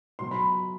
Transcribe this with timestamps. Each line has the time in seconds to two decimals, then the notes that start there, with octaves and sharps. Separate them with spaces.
0.19 B2 F#3 C6
0.31 B5